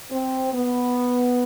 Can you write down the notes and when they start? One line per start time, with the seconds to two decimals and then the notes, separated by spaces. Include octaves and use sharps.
0.11 C4
0.53 B3